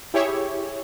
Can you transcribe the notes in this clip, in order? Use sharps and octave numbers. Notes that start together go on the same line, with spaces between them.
E4 G4 G#4 C#5 E5